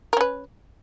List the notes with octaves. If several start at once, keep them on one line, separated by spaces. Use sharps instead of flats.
C#4 A#4 B4